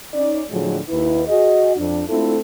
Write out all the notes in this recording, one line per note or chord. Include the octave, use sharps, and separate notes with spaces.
C#4 D#4 D5
A2 D3 F3 F#3 G#3
D#2 E4 B4
F#4 G#4 D#5
F2 D4
A3 C4 D4 E4 F4 A4